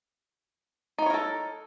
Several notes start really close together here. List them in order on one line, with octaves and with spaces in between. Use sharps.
D#4 B3 C#5 A#4 A4